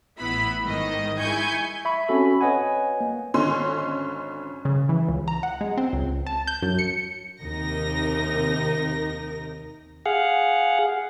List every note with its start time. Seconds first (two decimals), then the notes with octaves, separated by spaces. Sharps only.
0.19 A1 B3 E4 B5 B6
0.65 G#2 D#3 D#5
1.18 G#3 E4 G#5 C#6 G6 G#6
1.85 E5 B5 C#6
2.08 C4 C#4 F#4 A4 B5
2.41 B4 C#5 D#5 F#5 G#5
3.01 A#3
3.34 G#1 D3 C#4 D#5 C6
4.65 C#3
4.89 E3
5.08 C#2
5.28 A#5
5.43 F#5
5.61 G#3
5.77 C4
5.93 C#2
6.26 A5
6.47 G6
6.62 F#2
6.79 C#7
7.43 D#2 C3 D#4 A#4 A#6
10.06 G#4 F5 F#5